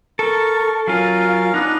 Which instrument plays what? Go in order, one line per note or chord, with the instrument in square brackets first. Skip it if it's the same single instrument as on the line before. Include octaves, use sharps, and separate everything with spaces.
[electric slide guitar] A4 [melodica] A#4 C#6
[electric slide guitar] F#3 F4 [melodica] C#4 A#4 F5
[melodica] B3 D4 B4 [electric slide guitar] D#4